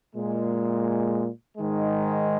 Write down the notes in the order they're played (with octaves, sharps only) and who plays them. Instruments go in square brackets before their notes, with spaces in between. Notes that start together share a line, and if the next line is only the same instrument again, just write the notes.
[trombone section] A#2 G#3
G#2 D#3 G#3